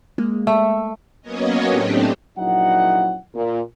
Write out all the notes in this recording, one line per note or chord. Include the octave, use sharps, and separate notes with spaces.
G#3 A#3
A3 E5
F#3 A#3 B3 C#4 C#5 D#5
A2 A3 C4 D4 G4
A#1 F#3 C#4 D#4 E4 F#5
A#2